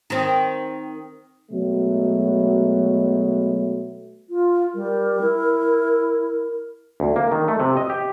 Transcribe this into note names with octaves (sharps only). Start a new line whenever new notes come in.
D#3 C4
B2 F#3 G#3 A3
F4
G3 A#4
E4
D2
A#3
D#3
A3
C3
D#5
G4